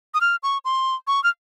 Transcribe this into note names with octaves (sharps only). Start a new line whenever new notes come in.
D#6
F6
C#6
C6
C#6
F6